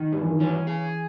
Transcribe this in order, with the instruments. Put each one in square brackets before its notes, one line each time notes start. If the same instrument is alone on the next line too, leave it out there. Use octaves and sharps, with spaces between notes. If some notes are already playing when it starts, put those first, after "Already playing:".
Already playing: [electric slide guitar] D#3
[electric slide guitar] G2 [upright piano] G3
[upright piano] E3
D#3
[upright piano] E3 [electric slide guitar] C#4
[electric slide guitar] G#4